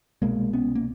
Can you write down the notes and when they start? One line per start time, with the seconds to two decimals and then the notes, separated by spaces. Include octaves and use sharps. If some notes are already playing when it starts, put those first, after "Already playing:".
0.22 C2 B2 G#3 A#3
0.53 B3 C#4
0.75 A#3